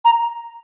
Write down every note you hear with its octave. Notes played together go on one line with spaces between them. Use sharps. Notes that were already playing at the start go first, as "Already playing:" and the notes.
A#5